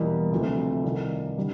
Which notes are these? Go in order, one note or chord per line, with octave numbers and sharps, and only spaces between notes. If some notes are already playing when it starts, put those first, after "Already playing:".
Already playing: E2 B2 G3 A#3
D2 C3 F3 A3
C2 C3 D#3
D3 G3